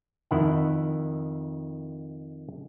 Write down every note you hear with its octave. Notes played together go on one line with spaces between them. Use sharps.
F2 D#3 E4 F#5